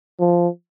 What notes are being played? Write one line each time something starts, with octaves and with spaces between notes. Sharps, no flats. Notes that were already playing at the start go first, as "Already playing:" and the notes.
F3